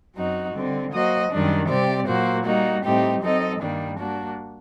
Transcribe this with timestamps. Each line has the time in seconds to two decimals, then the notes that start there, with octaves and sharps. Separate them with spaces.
0.15 F#2 F#3 C4 D#4 F#4
0.54 D3 G3 C4
0.92 F#3 A#3 F#4 C5 D#5
1.30 F#2 D#3 G3 D4
1.69 C3 G3 C4 G4 D5
2.07 A#2 F#3 A#3 F#4 C5
2.45 G3 A#3 D#4 F#4
2.83 A2 G3 C4 D#4 G4
3.22 F#3 C4 D#4 A4 D#5
3.60 G2 D#3 G3 A#3 D4
3.98 G3 A#3 D4 F#4